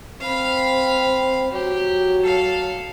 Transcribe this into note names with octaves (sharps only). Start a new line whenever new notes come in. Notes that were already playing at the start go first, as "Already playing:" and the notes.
C4 F5 B5
F#3 G4
A4 F5